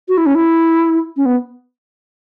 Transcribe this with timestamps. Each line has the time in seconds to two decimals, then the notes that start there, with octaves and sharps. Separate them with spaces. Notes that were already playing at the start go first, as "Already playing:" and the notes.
0.09 F#4
0.18 E4
0.26 C#4
0.35 E4
1.17 C#4
1.26 B3